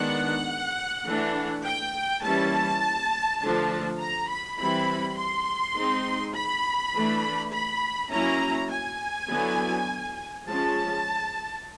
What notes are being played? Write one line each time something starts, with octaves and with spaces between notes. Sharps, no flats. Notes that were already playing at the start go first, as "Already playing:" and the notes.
Already playing: D#3 G#3 B3 D4 F#5
E3 A3 D4
G5
E3 G3 A#3 C#4 E4 A5
D3 F3 A3 D4
A#5
B5
E3 G3 C4 E4 B5
C6
G#3 C4 D#4
B5
E3 A3 D4
B5
F#3 A#3 C#4 E4 A#5
G#5
D3 F#3 B3 E4
F3 G#3 C#4 A5